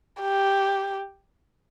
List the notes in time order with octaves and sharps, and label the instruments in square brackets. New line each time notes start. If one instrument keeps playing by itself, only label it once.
[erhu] G4